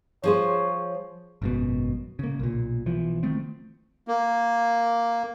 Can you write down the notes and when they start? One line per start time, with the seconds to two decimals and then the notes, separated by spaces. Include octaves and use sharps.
0.24 F3 G#4 C5 C#5
1.42 G#1 F#2 B2
2.19 C#3 A#3
2.39 B1 A#2
2.86 B1 E3 F3
3.23 D#3 A3 C4
4.08 A#3